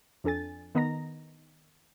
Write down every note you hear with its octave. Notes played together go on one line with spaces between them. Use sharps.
F2 D4 A4 G#5 A6
D#3 B3 D#5 A#5 A#6